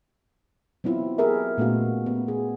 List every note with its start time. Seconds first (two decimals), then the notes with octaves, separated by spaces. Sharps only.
0.84 F#3 B3 C4 E4 F4
1.18 G4 G#4 A#4 B4 E5
1.58 A#2 A3 B3 C#4 F#4 F5
2.06 B3
2.28 G#4